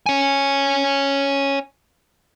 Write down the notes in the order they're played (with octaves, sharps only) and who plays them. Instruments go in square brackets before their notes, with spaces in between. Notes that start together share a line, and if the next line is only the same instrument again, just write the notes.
[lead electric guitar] C#5 G#5